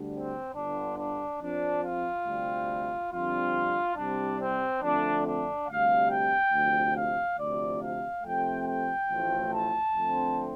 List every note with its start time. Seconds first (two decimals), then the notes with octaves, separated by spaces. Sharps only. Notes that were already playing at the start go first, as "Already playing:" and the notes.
Already playing: D2 D3 G3
0.12 C4
0.54 G1 G2 D3 D4
0.97 D4
1.40 F2 F3 C4 D4
1.82 F4
2.26 D2 C3 G3 C4
3.11 F2 D3 G3 C4 F4
3.96 C2 C3 G3 C4 D4
4.39 C4
4.81 F2 D3 A3 C4 D4
5.24 D4
5.67 D2 C3 G3 F5
6.09 G5
6.53 D2 C3 F3
6.95 F5
7.37 D2 C3 F3 D5
7.81 F5
8.24 F2 C3 A3 C4 G5
8.66 G5
9.08 A1 A2 F3 A3 C4
9.52 A5
9.94 F2 D3 A3 C4